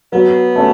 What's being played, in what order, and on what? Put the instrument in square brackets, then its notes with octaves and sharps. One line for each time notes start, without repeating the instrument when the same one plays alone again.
[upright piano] F#3 [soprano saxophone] B3
[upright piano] A3 C#4